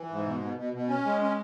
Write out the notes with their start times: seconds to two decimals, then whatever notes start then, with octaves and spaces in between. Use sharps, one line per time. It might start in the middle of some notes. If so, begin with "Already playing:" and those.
Already playing: E3
0.10 G#2
0.25 B2
0.41 B2
0.57 B2
0.74 B2
0.89 C#4
1.05 G#3
1.21 C#4